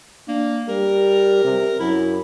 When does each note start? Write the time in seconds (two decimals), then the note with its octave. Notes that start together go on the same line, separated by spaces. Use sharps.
0.28 A#3 D4
0.68 G3 A#4
1.44 C3
1.80 F#2 E4